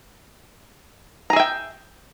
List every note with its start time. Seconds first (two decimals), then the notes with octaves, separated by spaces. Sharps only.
1.30 A#5
1.33 G#4
1.36 E5
1.40 G5